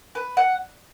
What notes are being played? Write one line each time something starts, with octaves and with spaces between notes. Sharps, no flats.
B4
F#5